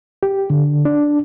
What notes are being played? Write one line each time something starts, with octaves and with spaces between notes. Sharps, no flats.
G4
D3
D4